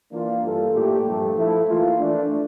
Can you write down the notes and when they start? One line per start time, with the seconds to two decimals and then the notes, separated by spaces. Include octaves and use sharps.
0.10 E3 A#3 D4 F4
0.42 G2 E3 A#3 F4 A4
0.72 A#2 A3 E4 G4
1.04 G2 F3 A3
1.35 F3 A3 E4 A4
1.67 E3 A#3 F4
1.98 E3 A3 D4